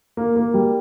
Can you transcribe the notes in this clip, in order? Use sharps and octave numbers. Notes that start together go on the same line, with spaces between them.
A#3
A#3
G3